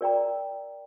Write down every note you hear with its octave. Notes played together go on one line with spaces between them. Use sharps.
A#4 D5 G5 A#5